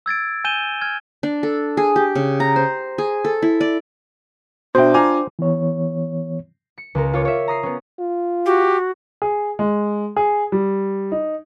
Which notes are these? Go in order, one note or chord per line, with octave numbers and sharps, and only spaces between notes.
E6 G#6 A6 D7
G#5 G6 D#7 E7 G7
F6 G#6
D4
A4
G#4
G4
C#3
A#5
C5
G#4
A4
E4
D5
B2 D4 F#4 C5 E5 G5
F4 G#5 A#5 D6
E3 B3 C#5
C#7
C#2 A#4
F4 C#5 D6
C#5 E5
A#5 D#6 C7
B3 C#4
F4
F#4 G4
G#4
G#3
G#4
G3
D#4